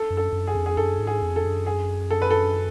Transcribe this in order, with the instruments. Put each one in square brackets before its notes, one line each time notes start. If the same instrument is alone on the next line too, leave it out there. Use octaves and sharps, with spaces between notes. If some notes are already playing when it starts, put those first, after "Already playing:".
Already playing: [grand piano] A4
[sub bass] F#2
[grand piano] A4
[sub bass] F#2
[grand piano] G#4
[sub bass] F2
[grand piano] G#4
[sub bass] F#2 [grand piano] A4
[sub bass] G#2
[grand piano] G#4
[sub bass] F2
[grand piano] A4
[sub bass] F#2
[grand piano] G#4
A4
B4
A4